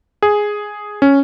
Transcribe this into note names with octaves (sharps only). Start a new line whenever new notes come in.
G#4
C#4